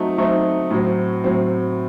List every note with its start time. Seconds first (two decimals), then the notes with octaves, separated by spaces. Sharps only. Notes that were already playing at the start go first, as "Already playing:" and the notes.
Already playing: F#3 A3 C4 D#4
0.18 F#3 A3 C4 D#4
0.71 A2 F#3 C4
1.24 A2 F#3 C4